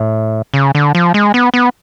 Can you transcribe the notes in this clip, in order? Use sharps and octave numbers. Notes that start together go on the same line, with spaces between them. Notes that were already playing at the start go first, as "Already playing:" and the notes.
Already playing: A2
C#3
D3
F3
G#3
B3
B3